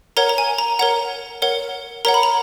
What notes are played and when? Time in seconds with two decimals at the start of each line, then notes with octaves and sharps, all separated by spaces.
0.17 A#4 C#5 F#5 A#5
0.29 A#5
0.38 G#5
0.58 A#5
0.79 A#4 C#5 F#5 A#5
1.42 A#4 C#5 F#5
2.05 A#4 C#5 F#5 A#5
2.14 B5
2.23 A#5